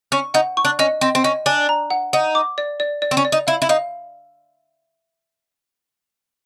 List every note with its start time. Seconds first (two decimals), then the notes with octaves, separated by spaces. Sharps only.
0.12 C#4 C#6
0.34 D#4 F#5
0.57 C#6
0.65 D4
0.79 C#4 D#5
1.01 C4 D#5
1.15 C4
1.24 C#4 D#5
1.46 D4 G#5
1.69 A#5
1.90 F#5
2.13 D#4 F#5
2.35 D6
2.58 D5
2.80 D5
3.02 D5
3.11 C4
3.17 C#4
3.25 D5
3.32 D#4
3.47 E4 F5
3.62 E4
3.69 D#4 F5